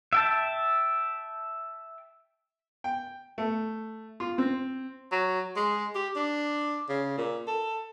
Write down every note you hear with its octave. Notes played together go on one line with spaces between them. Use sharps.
E5 G5 A5
G5
A3
F4
C4
F#3
G#3
G4
D4
C#3
A#2
A4